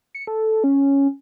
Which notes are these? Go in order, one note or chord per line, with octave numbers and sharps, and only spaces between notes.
C#7
A4
C#4